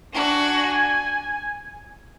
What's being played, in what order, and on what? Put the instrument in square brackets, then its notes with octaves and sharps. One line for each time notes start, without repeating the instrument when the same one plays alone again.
[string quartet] D4 F#4 [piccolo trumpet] G#5